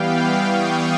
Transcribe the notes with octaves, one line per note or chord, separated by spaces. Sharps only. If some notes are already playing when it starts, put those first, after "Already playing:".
Already playing: E3 G3 B3 F5 G5
C#6 D#6